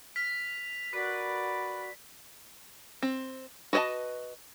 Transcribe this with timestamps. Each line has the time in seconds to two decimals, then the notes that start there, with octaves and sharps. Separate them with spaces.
0.16 F6 B6
0.93 F#4 A#4 B4 D5
3.02 C4
3.73 F#4 B4 C#5 D#5 A5